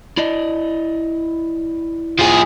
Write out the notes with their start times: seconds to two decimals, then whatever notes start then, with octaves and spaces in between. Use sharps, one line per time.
0.17 E4 D5 D#5
2.19 F3 G#4